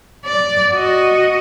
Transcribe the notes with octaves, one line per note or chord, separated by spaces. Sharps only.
D5
F#4 D#5